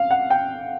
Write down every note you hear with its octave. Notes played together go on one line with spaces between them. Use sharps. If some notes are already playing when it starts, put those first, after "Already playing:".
Already playing: F5
F#5
G5